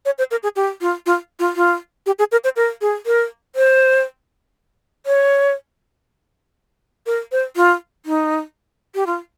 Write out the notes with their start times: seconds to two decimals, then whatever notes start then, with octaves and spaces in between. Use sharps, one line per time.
0.05 C#5
0.18 C5
0.31 A#4
0.43 G#4
0.56 G4
0.81 F4
1.06 F4
1.39 F4
1.56 F4
2.06 G4
2.19 G#4
2.32 A#4
2.44 C5
2.56 A#4
2.81 G#4
3.06 A#4
3.55 C5
5.06 C#5
7.06 A#4
7.32 C5
7.56 F4
8.06 D#4
8.95 G4
9.06 F4